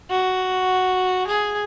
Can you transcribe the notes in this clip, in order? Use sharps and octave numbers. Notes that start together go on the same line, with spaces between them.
F#4
G#4